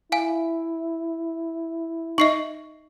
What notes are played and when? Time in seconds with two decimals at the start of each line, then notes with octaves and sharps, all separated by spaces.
0.12 E4 F5 G#5
2.18 D#4 D#5 E5 C7 F#7